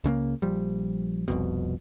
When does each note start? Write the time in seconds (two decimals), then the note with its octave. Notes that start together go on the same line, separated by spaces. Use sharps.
0.04 C#2 C#3 A3 A#3
0.42 A#1 F3 G3
1.28 F1 C2 F2 B2